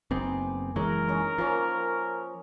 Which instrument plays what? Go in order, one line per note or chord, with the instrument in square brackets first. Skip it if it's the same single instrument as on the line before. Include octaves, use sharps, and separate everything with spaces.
[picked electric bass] F#1 B3 C4 [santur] D#4 G#5 D6
[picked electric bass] F#1 E3 G#3 [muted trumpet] A#4 [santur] C#5 D#5 A#5
[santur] C#4 D#4 C#6
[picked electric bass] F3 [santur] A#3 C#4